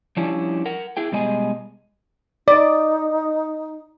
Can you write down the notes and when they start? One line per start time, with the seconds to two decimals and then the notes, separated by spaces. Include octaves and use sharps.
0.17 F3 G3 C#4 D4 E4
0.66 A#4 F#5
0.97 E4 G#4 G5
1.12 B2 G3 G#3 D#5 G#5
2.48 D#4 D5